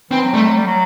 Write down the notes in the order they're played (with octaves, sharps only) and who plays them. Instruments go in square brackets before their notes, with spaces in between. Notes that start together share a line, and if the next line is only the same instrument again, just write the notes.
[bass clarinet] E3 [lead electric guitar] C4
[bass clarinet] F#3
[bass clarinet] G3 [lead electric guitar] A3
[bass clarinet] F#3
G3
F#3